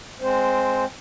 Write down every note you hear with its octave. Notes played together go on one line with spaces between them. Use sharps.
G#3 C4 C5